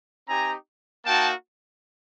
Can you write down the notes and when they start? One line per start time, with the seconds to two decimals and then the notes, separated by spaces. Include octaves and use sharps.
0.28 C4 D#4 G4 G#5 A#5
1.05 A#3 D#4 F#4 G5 A5